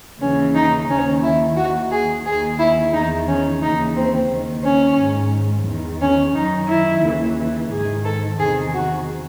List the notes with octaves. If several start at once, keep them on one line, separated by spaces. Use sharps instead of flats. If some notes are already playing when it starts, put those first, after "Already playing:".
D#2 C#3 E3 C#4
D#4
D#2 D#3 C#4
E4
D#2 D#3 F#4
G#4
D#2 D#3 G#4
E4
E2 D#3 D#4
C#4
D#2 C#3 E3 D#4
C4
D#2 D#3
C#4
G#2 D#3
E2 D#3
C#4
F#2 D#3 D#4
E4
D#2 C#3 E3
G#2 D#3 G#4
A4
E2 C3 D#3 G#4
F#4